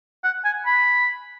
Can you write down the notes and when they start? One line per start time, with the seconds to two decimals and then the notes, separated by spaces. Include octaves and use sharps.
0.24 F#5
0.45 G#5
0.66 B5